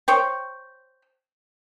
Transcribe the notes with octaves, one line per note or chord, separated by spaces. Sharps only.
C5 C#5 G5